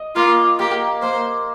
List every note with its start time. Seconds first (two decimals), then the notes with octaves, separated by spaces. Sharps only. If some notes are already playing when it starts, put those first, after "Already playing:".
Already playing: D#5
0.16 A#3 F4
0.59 A#3 G4
1.02 A#3 C5